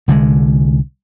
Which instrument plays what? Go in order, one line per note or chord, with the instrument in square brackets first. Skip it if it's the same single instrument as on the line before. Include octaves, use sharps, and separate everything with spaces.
[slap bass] C2 D3 D#3 G#3